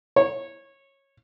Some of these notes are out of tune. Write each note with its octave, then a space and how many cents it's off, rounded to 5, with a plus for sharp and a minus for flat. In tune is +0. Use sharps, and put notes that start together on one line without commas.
C#5 -20